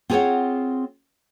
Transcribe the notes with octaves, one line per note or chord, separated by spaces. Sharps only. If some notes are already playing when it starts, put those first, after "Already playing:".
C4 F4 G#4 A4 C#5 F#5